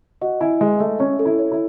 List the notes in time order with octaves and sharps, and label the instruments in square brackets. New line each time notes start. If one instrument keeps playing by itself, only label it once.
[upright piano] F#4 [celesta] D#5
[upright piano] E4 [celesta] G#5
[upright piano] G#3 [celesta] B4
[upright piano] A3 [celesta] D#5
[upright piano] C#4 [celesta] C#5
[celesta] A4
[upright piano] E4
[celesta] C#5
[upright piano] E4